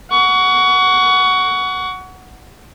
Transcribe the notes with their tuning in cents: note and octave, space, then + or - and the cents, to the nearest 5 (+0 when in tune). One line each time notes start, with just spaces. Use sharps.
F#5 +0 C#6 +25